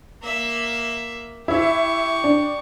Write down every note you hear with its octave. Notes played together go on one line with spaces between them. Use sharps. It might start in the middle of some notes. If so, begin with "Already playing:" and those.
A#3 E5
E4 G4 E5 C#6
D4